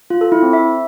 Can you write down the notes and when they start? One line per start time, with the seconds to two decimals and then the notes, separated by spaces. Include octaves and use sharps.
0.10 F4
0.21 A4
0.32 E4
0.43 C4
0.53 E5